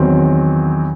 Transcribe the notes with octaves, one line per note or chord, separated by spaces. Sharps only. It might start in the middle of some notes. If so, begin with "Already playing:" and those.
Already playing: E2 D#3 F#3 C4